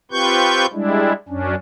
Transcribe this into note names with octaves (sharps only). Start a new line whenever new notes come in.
C4 F4 G4 B4 C#6 G6
G3 G#3 D4 E4
F#2 C#4 D4